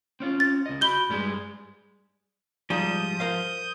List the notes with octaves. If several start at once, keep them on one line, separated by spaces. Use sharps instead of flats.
C4 C#4 F4
A6
C#2 D#5
F#4 B5 G6 G7
G2 G3 G#3
G#2 F3 G3 F4 D#6 G6
A#4 C5 F5